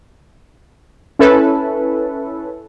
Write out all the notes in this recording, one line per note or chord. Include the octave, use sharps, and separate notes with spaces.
C#4 E4 A4 B4